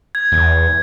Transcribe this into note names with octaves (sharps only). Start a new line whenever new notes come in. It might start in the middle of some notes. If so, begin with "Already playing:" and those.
G#6
E2